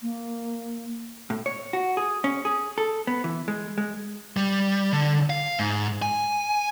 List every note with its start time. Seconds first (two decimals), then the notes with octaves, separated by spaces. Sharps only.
0.02 A#3
1.30 A2
1.46 C#5
1.73 F#4
1.97 G#4
2.24 C#4
2.45 G#4
2.78 A4
3.07 B3
3.24 E3
3.48 G#3
3.78 G#3
4.37 G3
4.93 D3
5.30 F5
5.59 G#2
6.02 G#5